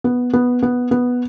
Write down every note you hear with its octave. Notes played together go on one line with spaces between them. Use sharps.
B3
B3
B3
B3